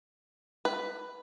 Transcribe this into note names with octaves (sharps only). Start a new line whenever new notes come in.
B4